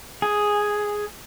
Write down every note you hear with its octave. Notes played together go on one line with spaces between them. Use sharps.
G#4